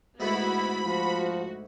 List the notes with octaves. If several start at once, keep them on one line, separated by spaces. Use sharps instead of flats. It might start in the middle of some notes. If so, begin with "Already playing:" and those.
D2 G#2 A3 B3 E4 F#4 B5
F3 F#4